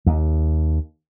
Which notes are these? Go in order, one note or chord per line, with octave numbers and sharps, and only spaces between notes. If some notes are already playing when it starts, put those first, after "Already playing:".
D#2